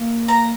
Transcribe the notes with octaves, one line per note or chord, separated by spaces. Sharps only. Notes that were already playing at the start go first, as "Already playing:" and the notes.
Already playing: A#3
A#5